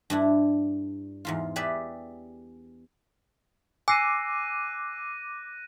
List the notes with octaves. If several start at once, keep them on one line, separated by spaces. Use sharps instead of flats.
G2 D4 E4
E2 G#2 F4
G4 G#4 B4 D5 E5
G#5 D6 E6 F#6 A#6 C7 D#7